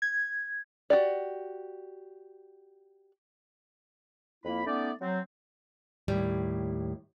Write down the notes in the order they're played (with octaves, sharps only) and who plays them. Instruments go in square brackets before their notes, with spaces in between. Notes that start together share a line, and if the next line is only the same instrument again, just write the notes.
[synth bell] G#6
[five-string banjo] F#4 G4 D5
[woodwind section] F2 A#3 E4 B5
A3 B3 C#4 D#4 D5
F#3 C4
[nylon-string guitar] D#2 A2 G3